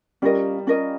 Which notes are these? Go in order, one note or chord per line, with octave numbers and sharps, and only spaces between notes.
G3 C#4 F4 A#4 D#5
C#4 F4 A#4 D#5